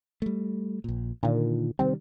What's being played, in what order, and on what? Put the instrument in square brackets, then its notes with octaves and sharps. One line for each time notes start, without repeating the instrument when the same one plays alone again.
[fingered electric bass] G3 A3
A#1 A#2
[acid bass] A#2 [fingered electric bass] D3 D#3
[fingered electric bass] C3 D#3 G3 [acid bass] C4